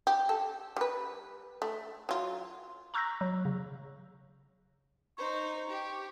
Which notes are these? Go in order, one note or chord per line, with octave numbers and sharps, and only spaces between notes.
G4
A4
G3 B4
A3
F#3 F4
A#5 C#6 E6 F#6 G6 A#6
F#3
C#3
D#4 C5 C#6
G4